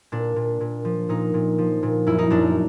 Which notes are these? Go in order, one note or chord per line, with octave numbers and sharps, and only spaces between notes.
A#2 D4
A#2
A#2
F3
A#2 D#4
A#2
F3
A#2
F#2 E4
D#4
F#2 D4